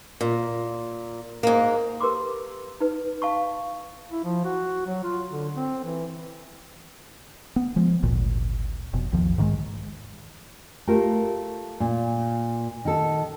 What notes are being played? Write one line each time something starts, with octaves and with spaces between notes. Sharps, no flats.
A#2
G#2 A#3
G4 A#4 B4 C6 D6
D#4 B4
F5 A5 C#6
E4
F3
F#4
F#3
F4
D3
C4
E3
B3
F3 G#3
G#1 D2 A#2
F1 B2
A#1 E2 D#3 F3
G#2 D#3 G3 G#3
A3 F4 G4 A#4
A#2
D#3 A4